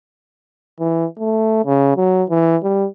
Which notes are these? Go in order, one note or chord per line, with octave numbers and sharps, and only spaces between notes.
E3
A3
C#3
F#3
E3
G3